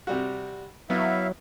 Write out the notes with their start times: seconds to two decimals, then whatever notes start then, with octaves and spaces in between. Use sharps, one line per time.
0.07 C3 G3 F#4
0.90 F#3 B3 E4 E5 F5